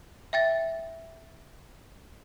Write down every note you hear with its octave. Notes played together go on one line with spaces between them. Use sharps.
E5 G5 A6